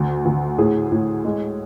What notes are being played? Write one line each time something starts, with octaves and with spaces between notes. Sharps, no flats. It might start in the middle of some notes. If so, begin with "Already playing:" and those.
Already playing: D2
D2
A2 G#4
A2
G#3